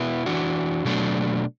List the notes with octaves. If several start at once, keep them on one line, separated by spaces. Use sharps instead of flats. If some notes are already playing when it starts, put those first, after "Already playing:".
Already playing: B2 B3 E4
E3 D4 F#4
B2 F#3 A3 D4